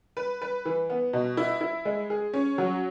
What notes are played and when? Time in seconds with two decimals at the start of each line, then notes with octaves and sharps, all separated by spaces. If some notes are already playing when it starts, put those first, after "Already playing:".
0.17 B4
0.42 B4
0.65 E3
0.90 B3
1.13 B2
1.37 E4
1.61 E4
1.85 G#3
2.10 G#4
2.34 C#4
2.58 F#3